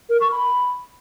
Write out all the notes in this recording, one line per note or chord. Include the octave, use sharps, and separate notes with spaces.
A#4
C#6
B5